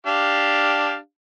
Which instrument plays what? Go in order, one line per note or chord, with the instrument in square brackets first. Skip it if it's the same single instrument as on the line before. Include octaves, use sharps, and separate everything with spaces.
[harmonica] D4 G4 F5